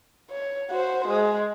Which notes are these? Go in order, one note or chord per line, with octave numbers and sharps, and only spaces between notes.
C#5
F#4 C5
G#3